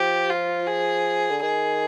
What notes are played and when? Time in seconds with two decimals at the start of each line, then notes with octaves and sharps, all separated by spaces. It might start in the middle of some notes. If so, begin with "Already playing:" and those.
Already playing: F3 G4
0.30 F4
0.67 G#4
1.30 D3
1.42 D#3 G#4